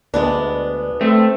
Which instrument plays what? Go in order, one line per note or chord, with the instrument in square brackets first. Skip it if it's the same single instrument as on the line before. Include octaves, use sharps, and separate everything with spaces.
[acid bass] D2 [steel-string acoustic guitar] G#3 B3 D4
[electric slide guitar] A3 [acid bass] C4